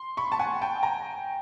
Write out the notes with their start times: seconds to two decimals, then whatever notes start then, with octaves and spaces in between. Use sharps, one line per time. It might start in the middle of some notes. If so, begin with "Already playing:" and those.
Already playing: C6
0.17 B5 C#6
0.32 A5
0.39 F#5 G#5
0.62 G5 A5
0.83 G#5 A#5